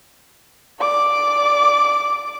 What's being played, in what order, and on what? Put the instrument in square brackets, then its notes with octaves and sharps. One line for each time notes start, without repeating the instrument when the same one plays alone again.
[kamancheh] D5 D6